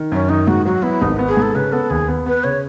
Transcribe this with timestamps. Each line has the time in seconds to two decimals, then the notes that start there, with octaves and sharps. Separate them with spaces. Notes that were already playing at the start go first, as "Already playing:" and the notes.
Already playing: D#3
0.12 F#2 C#4
0.29 D#3 D#4
0.48 G#2 F#4
0.65 F#3 F#4
0.83 B3 E4
1.02 G#1 D#4
1.19 B3
1.28 G#4
1.37 G#2
1.42 A4
1.55 C#3 B4
1.72 B3 A4
1.90 D#2 G#4
2.08 B3
2.26 B3 B4
2.44 C#3 C#5